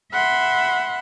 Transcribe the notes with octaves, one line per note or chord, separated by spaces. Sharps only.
E5 F#5 B5 C6